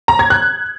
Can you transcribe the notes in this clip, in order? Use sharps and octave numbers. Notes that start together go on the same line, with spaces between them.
A#5
G#6
F#6